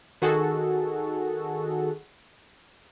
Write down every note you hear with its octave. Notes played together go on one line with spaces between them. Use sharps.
D#3 F#4 G#4 A4